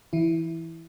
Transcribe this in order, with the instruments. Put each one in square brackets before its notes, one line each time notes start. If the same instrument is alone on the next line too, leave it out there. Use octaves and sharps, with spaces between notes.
[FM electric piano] E3 E4